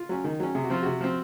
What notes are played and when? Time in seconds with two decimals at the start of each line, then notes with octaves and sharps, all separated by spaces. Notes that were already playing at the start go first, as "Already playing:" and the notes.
Already playing: F4
0.09 F#3 C#4
0.24 D#3
0.40 F#3 C#4
0.55 C3 G#4
0.64 F#4
0.70 F3 C4 F4
0.82 C3 F#4
1.01 F3 C4